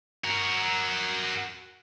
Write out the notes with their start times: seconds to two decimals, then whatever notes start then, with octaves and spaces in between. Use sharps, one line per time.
0.24 F#4 A#4